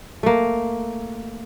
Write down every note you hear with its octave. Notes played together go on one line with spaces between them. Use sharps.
A3 A#3